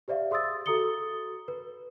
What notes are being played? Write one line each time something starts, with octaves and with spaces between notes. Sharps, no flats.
G4 C5 D5 E5 F5
G#4 C6 D#6 E6 A6
F#4 A4 A#5 D#6 C#7 G7
B4